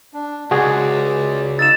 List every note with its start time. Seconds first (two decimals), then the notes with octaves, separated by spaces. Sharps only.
0.14 D4
0.51 C#2 G#3 F#4 G#4 D5
1.59 C#3 D#4 E6 A6 E7